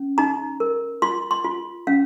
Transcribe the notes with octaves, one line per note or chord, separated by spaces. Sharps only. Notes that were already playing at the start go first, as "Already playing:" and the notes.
Already playing: C#4
D#4 A#5
A#4
F4 C6
C6
F4
C#4 F5